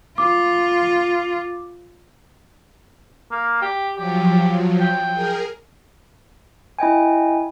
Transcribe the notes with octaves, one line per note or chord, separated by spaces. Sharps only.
F4 D6
A#3
G4
F3 F#3 G4
G5
G#4 A#4
E4 D#5 G5 G#5